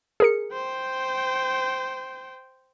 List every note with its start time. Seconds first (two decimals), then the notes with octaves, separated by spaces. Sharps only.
0.20 G#4 A#4 C#7
0.53 C5 G5